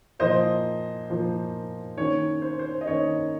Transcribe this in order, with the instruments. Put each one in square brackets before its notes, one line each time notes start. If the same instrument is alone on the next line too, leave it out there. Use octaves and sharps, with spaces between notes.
[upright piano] A#2 F3 A#3 C5 D#5
A#2 F3 A#3
D#3 A#3 C#4 C#5
C5
C5
D#5
D#3 A#3 C#4 C#5